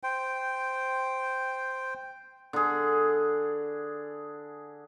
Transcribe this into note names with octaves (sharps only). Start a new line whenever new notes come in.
C5 G5
D3 G#4